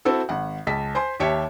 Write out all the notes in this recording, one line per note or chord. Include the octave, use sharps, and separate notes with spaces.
C4 E4 F#4 A4
G#1 F#5
C#2 A5 B6
C5 G#5 C6
D#2 G4 C#5 E5 A5 C#7